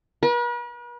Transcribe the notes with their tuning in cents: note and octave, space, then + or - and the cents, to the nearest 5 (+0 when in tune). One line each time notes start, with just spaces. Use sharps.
B4 -45